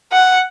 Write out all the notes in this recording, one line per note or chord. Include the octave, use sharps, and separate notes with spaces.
F#5